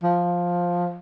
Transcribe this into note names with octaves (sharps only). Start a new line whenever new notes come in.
F3